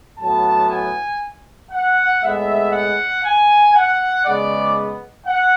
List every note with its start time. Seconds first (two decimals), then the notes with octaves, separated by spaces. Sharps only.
0.19 A2 F#3 B3 A5
0.70 G#5
1.71 F#5
2.22 A2 G#3 B3 E5
2.72 F#5
3.24 G#5
3.74 F#5
4.24 C#3 G#3 B3 D5
5.27 F#5